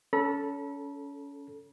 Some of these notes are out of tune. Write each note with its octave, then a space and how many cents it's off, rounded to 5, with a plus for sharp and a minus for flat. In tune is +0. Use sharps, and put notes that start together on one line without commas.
C#4 +25 A4 +0 B5 -40